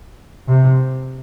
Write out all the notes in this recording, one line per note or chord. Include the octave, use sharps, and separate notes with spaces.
C3